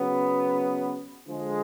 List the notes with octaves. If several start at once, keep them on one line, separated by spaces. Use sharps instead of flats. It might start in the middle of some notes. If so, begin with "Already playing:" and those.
Already playing: C#3 F#3 B3
D3 F3 G#3